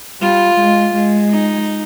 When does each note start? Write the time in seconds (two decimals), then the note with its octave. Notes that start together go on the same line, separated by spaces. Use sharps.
0.21 G3 F4
0.57 G#3
0.94 G#3
1.30 D#4